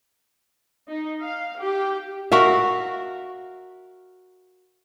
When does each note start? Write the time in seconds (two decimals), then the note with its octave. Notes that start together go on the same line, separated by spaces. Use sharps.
0.89 D#4
1.22 F5
1.59 G4
2.32 F#4 A#4 E5 F5